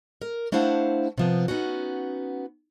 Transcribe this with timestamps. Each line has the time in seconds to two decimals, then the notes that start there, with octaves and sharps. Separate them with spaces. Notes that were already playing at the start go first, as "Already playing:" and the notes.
0.22 A#4
0.52 A3 D4 E4 C5 F5 F#5
1.18 C3 F3 B3
1.48 B3 C#4 D#4 F#4